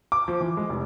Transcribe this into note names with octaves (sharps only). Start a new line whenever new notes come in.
D6
F3
E3
G#3
F1